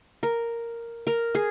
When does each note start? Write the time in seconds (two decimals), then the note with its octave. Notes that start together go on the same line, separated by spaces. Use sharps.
0.23 A#4
1.07 A#4
1.35 G#4